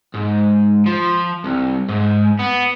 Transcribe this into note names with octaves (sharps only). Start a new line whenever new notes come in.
G#2
F3
C2
G#2
B3